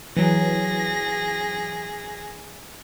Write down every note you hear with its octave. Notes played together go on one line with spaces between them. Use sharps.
E3 F#3 G#4 A#6